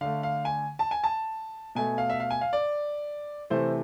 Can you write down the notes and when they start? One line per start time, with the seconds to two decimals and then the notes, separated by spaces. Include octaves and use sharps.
0.01 D3 A3 F5
0.23 F5
0.45 G#5
0.79 A5
0.91 G#5
1.04 A5
1.75 B2 A3 G#5
1.98 F5
2.10 E5
2.20 F5
2.30 G#5
2.41 F5
2.53 D5
3.50 C3 E3 A3 C5